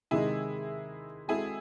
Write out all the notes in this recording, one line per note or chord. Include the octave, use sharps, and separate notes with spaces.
C3 D#3 G#3 D#4 E4 G#4
G#3 C4 E4 F#4 G#4 A4